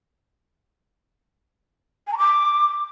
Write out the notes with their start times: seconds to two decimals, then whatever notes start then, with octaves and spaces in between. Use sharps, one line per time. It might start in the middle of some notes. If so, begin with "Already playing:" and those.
2.07 G#5
2.12 A#5
2.17 D6